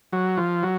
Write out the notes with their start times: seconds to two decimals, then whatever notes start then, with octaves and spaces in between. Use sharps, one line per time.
0.13 F#3
0.38 F3
0.63 F#3